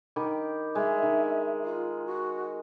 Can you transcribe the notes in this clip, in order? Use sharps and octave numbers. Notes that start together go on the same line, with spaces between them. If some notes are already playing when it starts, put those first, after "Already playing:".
D#3 G4 B5
G#3 E5
D#3
F4
F#4